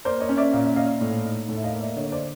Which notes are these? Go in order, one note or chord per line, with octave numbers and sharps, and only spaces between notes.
A#3 C5 D5
C#5 D#5
C#4
D5 E5
A#2 F5
E5
A#2 D#5 F5
A2
D#4
A2
E5
D#5 F5
A#3
D5 E5
D3 C#5 D#5
C5 D5